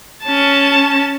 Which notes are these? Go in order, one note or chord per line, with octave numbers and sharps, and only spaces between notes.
C#4 A5